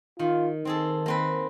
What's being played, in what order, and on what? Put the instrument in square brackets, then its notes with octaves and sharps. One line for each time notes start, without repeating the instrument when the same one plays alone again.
[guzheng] D#3 [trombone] F4
[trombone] D#3 [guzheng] C4 G#4 A4
[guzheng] A#3 C4 B4